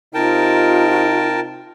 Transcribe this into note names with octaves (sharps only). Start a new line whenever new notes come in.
C3 D#4 F4 A#4 G5 A5